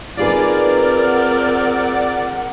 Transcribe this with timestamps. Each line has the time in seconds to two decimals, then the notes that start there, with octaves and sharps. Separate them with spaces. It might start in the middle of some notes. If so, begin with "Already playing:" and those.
0.17 C4 D#4 F4 G#4 A#4 B4 D5 F6
1.05 F#5